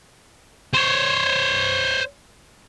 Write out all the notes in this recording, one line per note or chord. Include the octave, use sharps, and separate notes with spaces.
C5 C#5